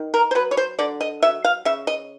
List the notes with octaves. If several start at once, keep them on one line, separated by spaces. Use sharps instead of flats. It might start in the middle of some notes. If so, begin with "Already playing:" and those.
Already playing: D#3
A#4
C5
F#3 B4
C#5
C5
D3 D5
D#5
F#3 E5
F5
C#3 E5
D#5